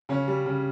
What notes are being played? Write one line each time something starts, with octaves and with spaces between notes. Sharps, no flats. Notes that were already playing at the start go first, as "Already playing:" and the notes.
C#3 C#4
G3
C#3